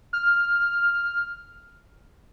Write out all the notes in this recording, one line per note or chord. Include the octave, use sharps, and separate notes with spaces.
F6